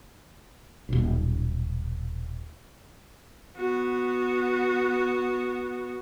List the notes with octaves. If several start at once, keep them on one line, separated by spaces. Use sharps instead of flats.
D#1 B1
B3 F#4